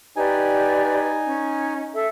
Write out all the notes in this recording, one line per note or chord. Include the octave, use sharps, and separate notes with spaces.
D#4 G4 B4 D5 G#5
C#4
A4 E5